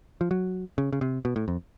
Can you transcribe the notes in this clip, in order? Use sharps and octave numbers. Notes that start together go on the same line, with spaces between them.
F3
F#3
C#3
C#3
C3
B2
A2
F2